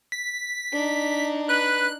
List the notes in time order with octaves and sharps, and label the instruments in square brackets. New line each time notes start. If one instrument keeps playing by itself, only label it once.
[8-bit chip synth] B6
[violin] D4 D#4
[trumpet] B4 [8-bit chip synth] F#6